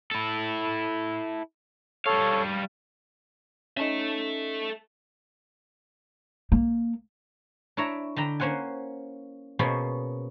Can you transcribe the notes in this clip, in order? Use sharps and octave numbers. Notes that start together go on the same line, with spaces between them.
E4 A4
G3 A4 C#5 F5
C#4 D#4 A4 E5
A#3
D4 E4 C#5 E5 A#5
D3 D4 G5 A#5 B5
A#3 C#4 C5 F#5 G#5
B2 A#3 C#4 G#4 C5 B5